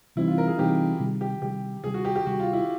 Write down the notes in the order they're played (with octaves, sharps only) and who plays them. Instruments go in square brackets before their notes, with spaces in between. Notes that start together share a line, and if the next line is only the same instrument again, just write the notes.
[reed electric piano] C3 E3 G3 C4 D#4 [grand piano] E4
[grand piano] F4
A#4
G#4
[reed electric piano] C3 E3 G3 C4 D#4 [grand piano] G4
[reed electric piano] C3 D#3 G3
[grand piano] G4
[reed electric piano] C3 D#3 G3 [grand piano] G4
[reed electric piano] C3 D#3 G3 [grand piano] G#4
[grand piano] F#4
G4
G4
[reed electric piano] C3 D#3 G3 [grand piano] F#4
[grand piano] F4
E4